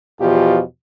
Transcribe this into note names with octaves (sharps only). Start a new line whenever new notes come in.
E2 B2 F3 F4 G4